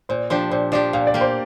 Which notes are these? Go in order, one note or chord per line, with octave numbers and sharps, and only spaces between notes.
A#2 C5
F3 D4 G4 C5
A#2 C5
F3 D4 G4 D5
A#2 F5
D5
A#3 G4
C5